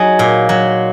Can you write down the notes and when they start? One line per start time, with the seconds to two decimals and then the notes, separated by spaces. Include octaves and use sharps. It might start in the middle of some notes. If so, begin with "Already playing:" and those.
Already playing: F#3 D#4 G#4
0.19 A#2
0.49 F#3